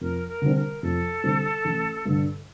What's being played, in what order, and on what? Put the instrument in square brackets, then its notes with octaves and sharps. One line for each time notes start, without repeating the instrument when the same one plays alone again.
[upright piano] F2 [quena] A#4
[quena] A#4
[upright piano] D3 G3 C4
[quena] A#4
[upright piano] F2 [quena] A4
[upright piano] D3 G3 C4
A1
G2 D3